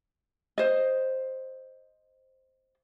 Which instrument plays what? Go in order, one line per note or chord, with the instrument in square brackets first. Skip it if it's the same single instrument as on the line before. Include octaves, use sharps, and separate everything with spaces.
[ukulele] C5 D#5